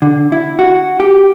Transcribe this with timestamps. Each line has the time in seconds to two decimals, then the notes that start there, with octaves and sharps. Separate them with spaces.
0.02 D3
0.32 E4
0.59 F#4
1.00 G4